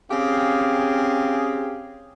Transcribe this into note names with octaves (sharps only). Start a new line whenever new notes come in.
C4 C#4 G4 G#4 F5